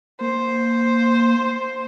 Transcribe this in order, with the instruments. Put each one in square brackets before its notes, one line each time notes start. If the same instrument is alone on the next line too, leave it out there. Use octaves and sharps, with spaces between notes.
[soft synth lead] A#3 [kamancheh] C5